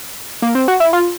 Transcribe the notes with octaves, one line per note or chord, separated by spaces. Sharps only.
A#3
C4
F#4
E4
F4